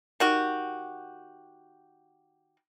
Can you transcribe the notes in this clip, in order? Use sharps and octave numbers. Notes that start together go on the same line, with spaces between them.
D#3 F#4 G4